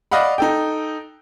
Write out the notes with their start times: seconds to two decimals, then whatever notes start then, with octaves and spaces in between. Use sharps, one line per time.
0.11 D5 D#5 F5 F#5 B5
0.38 D#4 A4 G5